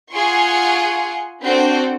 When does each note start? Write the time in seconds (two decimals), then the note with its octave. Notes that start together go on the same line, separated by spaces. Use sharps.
0.14 F4 G#4 F#5 G#5 C6 C#6
1.43 C4 D4 F#4 A4 C5